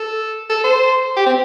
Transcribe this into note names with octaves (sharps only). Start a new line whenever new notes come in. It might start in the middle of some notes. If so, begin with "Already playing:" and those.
Already playing: A4
A4
C5
G4
C4